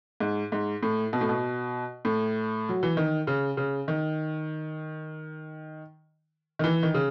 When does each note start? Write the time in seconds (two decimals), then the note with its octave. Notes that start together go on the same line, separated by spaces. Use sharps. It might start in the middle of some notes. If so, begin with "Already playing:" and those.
0.20 G#2
0.52 G#2
0.83 A2
1.13 B2
1.21 A2
1.29 B2
2.05 A2
2.69 F#3
2.83 E3
2.97 D#3
3.27 C#3
3.57 C#3
3.88 D#3
6.59 D#3
6.64 E3
6.83 D#3
6.94 C#3